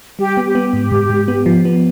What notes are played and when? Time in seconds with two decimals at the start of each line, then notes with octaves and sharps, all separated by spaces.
0.19 G3 G4
0.37 B3
0.46 G4
0.55 B3
0.73 G#2
0.92 G#2
1.09 G#2
1.28 B3
1.46 F3
1.65 B3